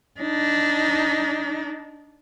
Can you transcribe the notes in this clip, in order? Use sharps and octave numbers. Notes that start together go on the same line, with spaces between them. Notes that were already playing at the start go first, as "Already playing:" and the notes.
D4 D#4